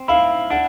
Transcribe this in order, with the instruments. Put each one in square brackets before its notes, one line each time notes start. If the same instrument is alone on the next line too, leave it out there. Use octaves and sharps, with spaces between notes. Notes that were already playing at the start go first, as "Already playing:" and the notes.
Already playing: [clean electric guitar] C4
[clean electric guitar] E4 [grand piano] F5
[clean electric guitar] D4 [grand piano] F#5